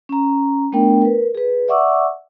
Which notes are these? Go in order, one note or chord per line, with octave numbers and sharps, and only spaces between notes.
C#4 A#5
A3 B3 D4 A#4 G5
A#4 B4
G#4 B4
D5 E5 F#5 C#6 D6 E6